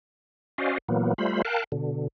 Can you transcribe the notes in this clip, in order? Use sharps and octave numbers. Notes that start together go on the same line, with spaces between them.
C#4 F#4 C5 D5 D#5 F5
A#2 E3 F#3 A#3 B3
G3 A3 F4 C5 B5
A#4 F5 G5 A5 F#6
B2 D3